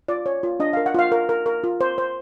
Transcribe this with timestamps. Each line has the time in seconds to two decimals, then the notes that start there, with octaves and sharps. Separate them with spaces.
0.08 F4 D5
0.26 C#5
0.43 F4
0.60 D4 D#5
0.73 A#4 F5
0.86 F#5
0.95 F4 F5
1.12 A#4
1.29 A#4
1.46 A#4
1.64 F4
1.81 C5
1.98 C5